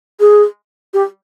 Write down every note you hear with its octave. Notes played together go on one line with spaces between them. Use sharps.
G#4
G4